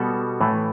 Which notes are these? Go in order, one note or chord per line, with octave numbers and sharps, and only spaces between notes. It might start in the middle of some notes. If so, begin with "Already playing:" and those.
Already playing: B2 G3 B3 F#4 A4
A2 E3 A3